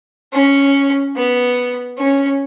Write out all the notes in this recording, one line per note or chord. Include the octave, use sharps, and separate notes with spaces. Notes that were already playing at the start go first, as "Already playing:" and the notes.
C#4
B3
C#4